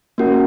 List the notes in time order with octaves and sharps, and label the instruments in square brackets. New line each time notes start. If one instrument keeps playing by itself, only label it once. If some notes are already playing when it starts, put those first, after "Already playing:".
[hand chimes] A#3 C#4 F#4 A#4